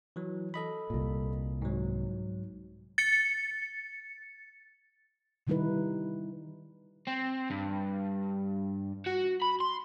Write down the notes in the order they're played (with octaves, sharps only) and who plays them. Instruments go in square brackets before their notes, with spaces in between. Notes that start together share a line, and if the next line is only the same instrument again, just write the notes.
[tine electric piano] E3 F#3
A4 D#5 B5
[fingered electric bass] C2 A#2
[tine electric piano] G#2 F#3
[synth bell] A6 C#7
[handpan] C3 D#3 G3 D#4 E4 B4
[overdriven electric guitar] C4
G2
F#4
B5
C6